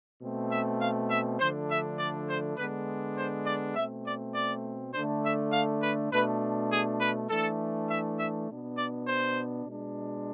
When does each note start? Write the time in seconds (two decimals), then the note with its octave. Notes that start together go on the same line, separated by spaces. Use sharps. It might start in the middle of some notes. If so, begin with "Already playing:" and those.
0.22 B2 A3 C4
0.52 E5
0.81 F5
1.10 E5
1.39 D3 F3 A3 D4 C5
1.70 E5
1.99 D5
2.29 C5
2.57 D3 G#3 B3 D4 B4
3.18 C5
3.46 D5
3.76 B2 A3 C4 E5
4.06 D5
4.35 D5
4.94 D3 A3 D4 C5
5.24 E5
5.53 F5
5.83 B4
6.12 B2 A3 D4 B4
6.72 G#4
7.01 B4
7.30 E3 A3 D4 A4
7.89 E5
8.19 E5
8.49 B2 B3 D4
8.78 D5
9.08 C5
9.66 B2 G#3 D4